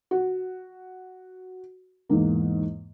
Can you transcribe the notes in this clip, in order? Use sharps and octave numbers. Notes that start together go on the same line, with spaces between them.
F#4
E2 G#2 A#3